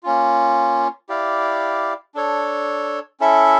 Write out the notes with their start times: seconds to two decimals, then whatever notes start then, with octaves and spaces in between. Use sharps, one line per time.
0.03 A#3 C#4 F4
1.09 E4 G4 D5 F5
2.14 D4 A4 C#5
3.20 C#4 E4 A4 E5